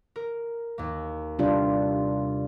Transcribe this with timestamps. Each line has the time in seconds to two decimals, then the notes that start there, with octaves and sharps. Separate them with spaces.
0.16 A#4
0.78 D#2 A#3
1.39 C3 G3 D4 F4